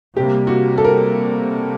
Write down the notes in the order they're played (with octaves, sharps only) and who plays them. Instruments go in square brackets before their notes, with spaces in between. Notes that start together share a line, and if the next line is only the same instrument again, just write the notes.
[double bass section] C3 G3 A#3 [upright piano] G4
[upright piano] F#4
A4
A#4